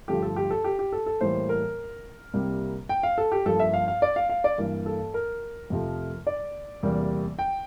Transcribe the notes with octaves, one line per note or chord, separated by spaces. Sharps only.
G2 D3 F3 A3 G4
A4
G4
A4
G4
G4
A4
A4
A2 E3 G3 A#3 C5
A#4
C2 C3 G3 A#3
G5
F5
A4
G4
G2 F3 A#3 A4
E5
F5
F5
D5
F5
F5
D5
G2 E3 A#3
A4
A#4
F2 C3 F3 A3
D5
E2 C3 G3 A#3
G5